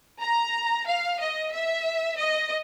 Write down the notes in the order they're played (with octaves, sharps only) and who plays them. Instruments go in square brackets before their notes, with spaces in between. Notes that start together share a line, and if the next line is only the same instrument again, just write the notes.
[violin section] A#5
F5
D#5
E5
D#5